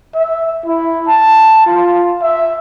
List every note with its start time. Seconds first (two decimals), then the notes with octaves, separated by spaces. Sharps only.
0.15 E5
0.66 E4
1.08 A5
1.66 F4
2.22 E5